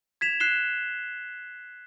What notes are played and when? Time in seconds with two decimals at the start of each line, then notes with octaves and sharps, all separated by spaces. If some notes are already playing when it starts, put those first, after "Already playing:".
0.21 G#6 B6 E7 F7
0.40 F#6 C7 E7 G7